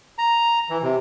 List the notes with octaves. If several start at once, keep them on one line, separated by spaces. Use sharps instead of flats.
A#5
E3
C3